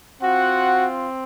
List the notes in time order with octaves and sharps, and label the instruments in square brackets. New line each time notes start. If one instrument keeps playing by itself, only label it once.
[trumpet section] C4 F4 F#4 F#5